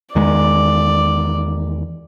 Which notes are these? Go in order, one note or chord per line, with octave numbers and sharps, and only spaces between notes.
E2 D#3 G#3 D5